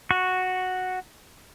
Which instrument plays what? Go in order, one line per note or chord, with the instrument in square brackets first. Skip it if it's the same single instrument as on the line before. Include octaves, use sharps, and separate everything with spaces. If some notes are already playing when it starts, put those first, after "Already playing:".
[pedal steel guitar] F#4 C#6